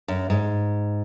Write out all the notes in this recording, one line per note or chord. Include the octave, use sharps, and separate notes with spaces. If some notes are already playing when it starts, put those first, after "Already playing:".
F#2
G#2